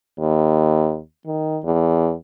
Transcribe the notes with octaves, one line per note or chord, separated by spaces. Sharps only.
D#2
D#3
E2